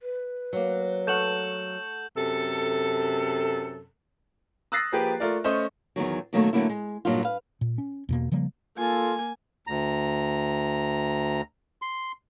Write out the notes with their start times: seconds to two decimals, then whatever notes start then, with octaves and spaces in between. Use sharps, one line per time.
0.02 B4
0.53 F#3 A#3
1.07 A3 F#5 G6 E7 F#7
2.16 F#2 C3 A4
4.72 D#6 E6 F#6 A6 A#6 C7
4.92 F3 A#3 G4 G#4 B4
5.20 A3 F4 A#4 D5
5.44 A3 C#4 C5 D#5
5.96 E2 G2 D#3 F#3
6.33 B2 D#3 F#3 G3 A3 A#3
6.53 D3 F#3 A3 A#3 E4
6.70 G#3
7.05 G2 A#2 F#3 D#4 F4
7.23 B4 F5
7.61 A#2
7.78 C#4
8.09 E2 B2 A#3
8.32 C#3 F3 G3 A#3
8.77 A#3 F4 A4 G#5
9.67 D2 A#5
11.82 C6